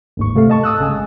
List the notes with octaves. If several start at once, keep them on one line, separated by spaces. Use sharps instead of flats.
G1 D#2 G#2 C#6
C3 A3 A4 F5
D#5 A5 C#6
A5 D#6 E6 F#6
G#1 C#3 G#5
G#3